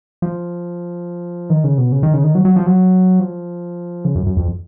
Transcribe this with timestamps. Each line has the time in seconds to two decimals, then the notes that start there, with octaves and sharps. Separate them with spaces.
0.22 F3
1.50 D#3
1.64 C#3
1.78 B2
1.92 C#3
2.03 D#3
2.14 C#3
2.24 D#3
2.35 F#3
2.45 F#3
2.56 F3
2.67 F#3
3.20 F3
4.05 C#3
4.15 F#2
4.26 F#2
4.37 F2